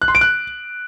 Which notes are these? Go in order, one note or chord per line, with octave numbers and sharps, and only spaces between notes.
F#6
C6
D7
F#6